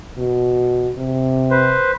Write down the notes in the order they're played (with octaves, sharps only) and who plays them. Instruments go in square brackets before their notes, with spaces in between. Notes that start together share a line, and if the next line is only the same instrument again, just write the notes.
[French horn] B2
C3
[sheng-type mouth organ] B4 C5